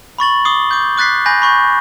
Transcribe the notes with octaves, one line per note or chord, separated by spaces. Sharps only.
B5 C#6 A6 F#7
D6 D#6 C7 G7
D6 G6
D6 F#6 A6 B6 C7
G#5 B5 G6 A#6
B5 C#6 G6